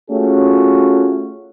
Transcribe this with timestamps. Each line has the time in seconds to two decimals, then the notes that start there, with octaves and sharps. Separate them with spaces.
0.10 A3 C#4 F4 F#4 G#4